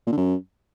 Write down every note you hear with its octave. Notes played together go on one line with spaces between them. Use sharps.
A#2
D3
F#2